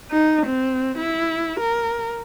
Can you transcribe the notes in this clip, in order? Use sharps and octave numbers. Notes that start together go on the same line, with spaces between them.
D#4
C4
E4
A#4